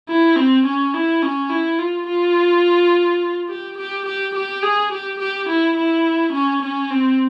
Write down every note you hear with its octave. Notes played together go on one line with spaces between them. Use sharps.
E4
C4
C#4
E4
C#4
E4
F4
F4
G4
G4
G4
G4
G#4
G4
G4
E4
E4
C#4
C#4
C4